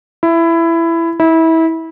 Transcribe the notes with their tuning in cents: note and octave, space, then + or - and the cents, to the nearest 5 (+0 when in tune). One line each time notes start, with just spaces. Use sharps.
E4 +15
E4 -25